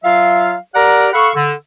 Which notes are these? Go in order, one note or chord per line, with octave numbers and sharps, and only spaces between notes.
F#3 F4 E5 F5
G4 A#4 D5 F#5 A#5
A4 F5 F#5 B5 C#6
D3